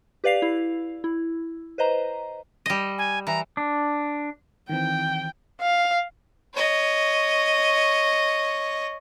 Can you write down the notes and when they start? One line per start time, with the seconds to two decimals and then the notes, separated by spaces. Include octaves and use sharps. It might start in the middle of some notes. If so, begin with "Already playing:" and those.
0.24 G4 B4 D5 F5 C7 F7
0.42 E4
1.04 E4
1.78 B4 C5 D#5 A#5
2.66 G3 D#5
2.98 G#5
3.27 E3 A#5
3.57 D4
4.69 D#3 E3 C4 G5
5.61 F5
6.54 C#5 D#5